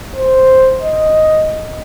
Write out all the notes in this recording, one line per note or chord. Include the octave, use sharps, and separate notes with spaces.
C5
D#5